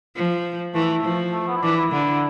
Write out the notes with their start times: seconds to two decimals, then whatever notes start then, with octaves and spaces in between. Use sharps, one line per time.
0.16 F3
0.75 E3 A3
1.04 F3
1.33 A3
1.48 B3
1.56 E4
1.63 E3 D4
1.77 E4
1.92 D3